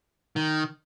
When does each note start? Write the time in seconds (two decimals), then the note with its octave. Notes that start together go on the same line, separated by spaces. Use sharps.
0.36 D#3